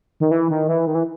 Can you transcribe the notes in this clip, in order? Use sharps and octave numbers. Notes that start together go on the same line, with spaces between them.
D#3
E3
D#3
E3
D#3
E3